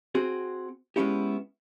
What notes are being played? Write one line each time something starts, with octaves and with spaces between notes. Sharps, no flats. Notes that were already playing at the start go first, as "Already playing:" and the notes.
C4 F#4 G#4
G#3 B3 C#4 E4 G4